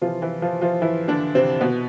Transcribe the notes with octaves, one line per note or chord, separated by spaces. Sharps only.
C3 E3 F3 F4
E3 E4
F3 F4
F3 F4
E3 E4
D3 D4
C3 C4
B2 B3